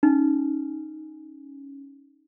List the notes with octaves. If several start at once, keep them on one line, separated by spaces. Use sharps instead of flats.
C#4 D#4